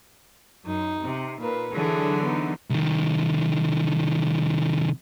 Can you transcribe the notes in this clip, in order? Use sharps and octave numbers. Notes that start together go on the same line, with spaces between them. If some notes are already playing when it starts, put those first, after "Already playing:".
F#2 D#4
C3
A#2 A#4 B4
D3 E3 F#3 G#4 A4
B3 D#4
C2 D#3